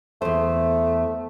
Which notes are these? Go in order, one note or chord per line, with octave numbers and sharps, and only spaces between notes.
E2 A3 C5